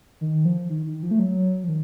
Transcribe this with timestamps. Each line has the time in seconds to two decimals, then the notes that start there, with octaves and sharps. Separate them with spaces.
0.21 D#3
0.45 F3
0.70 D#3
0.86 D#3
1.03 F3
1.11 A3
1.19 F#3
1.64 F3
1.68 D#3